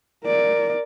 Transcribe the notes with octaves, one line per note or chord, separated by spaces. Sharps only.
A#4 D5